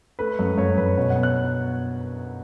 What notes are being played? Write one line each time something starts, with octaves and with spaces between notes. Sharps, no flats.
A3 B4
F#2
F#2 C#5
F#2 B4
B2 C#5
F#5
B3
F#6